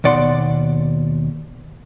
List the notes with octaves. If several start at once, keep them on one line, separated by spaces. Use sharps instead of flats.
D#2 B2 D5 F#5 C6